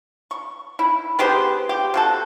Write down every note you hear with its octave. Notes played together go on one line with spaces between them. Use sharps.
C#6
E4
B3 G4 G#4 C5
G4
C3 F#4 A4